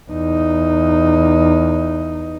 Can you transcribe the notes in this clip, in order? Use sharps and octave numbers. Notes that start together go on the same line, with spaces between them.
E2 D#4